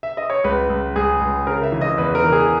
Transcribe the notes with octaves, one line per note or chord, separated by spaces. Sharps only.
E5
D#5
C#5
C#2 B4
C#2
C#2 G#4
C#2
C#3 A#4
E5
E3
D#5
E2 B4
A#4
E3
G#4